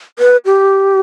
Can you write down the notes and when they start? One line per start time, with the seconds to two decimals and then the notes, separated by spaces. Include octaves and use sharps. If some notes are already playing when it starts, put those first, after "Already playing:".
0.19 B4
0.45 G4